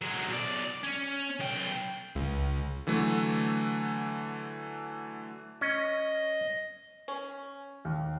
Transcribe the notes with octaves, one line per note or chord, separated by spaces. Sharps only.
F#3 G#3
B1 D5
C#4
B1 G5
C#2
D3 E3 F#3 A3
C#4 D#5
C#4
D#2